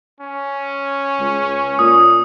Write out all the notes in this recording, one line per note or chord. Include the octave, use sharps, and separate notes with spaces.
C#4
C#2
A#2 D#6